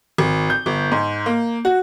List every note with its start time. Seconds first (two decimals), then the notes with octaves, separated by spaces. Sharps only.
0.18 G#1
0.50 G6
0.66 G1
0.91 G#2
1.26 A#3
1.65 F#4